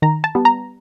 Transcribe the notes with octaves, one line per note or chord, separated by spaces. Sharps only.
D#3 A#5
A5
G3 B3
A#5